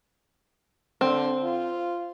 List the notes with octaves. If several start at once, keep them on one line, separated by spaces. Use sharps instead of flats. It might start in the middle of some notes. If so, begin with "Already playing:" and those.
D3 C4
F4